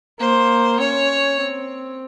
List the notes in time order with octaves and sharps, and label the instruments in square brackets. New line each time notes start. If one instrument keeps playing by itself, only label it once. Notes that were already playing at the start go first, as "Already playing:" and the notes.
[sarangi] A#3 [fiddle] C5
[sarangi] C#4 [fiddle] C#5
[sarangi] C4